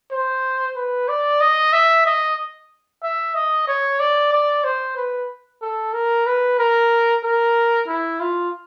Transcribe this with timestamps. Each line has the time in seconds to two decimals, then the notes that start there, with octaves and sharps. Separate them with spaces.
0.12 C5
0.76 B4
1.08 D5
1.41 D#5
1.73 E5
2.06 D#5
3.03 E5
3.35 D#5
3.68 C#5
4.00 D5
4.33 D5
4.64 C5
4.97 B4
5.62 A4
5.94 A#4
6.26 B4
6.59 A#4
7.24 A#4
7.88 E4
8.20 F4